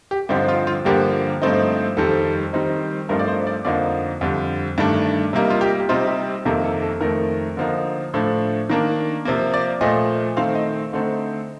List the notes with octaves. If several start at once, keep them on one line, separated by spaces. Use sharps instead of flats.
G4
G2 D3 F3 C4 D#4 G4
F4
F4
G2 D3 F3 A#3 G4
G2 F3 A3 C4 D#4
F2 D#3 G3 C4 A4
D#3 G3 C4 D#4
G2 F3 A3 C4 D#4 A#4
D5
C5
D5
F2 D3 F3 A#3 D#4 D5
F2 D3 G3
G2 D#3 A3 D4
C3 G3 A#3 D#4
F4
G4
G4
C3 G3 C4 D#4 F4
G4
F2 C3 D#3 A#3 A4
A4
A4
F2 D#3 A3 A#4
D3 F3 A#3 D#4
A2 F3 A3 D4
D#3 A#3 D4
C3 F3 A#3
D5
A#2 F3 A3 D#5
D#3 A3 C4 F5
D#5
D3 A3 C4 D#4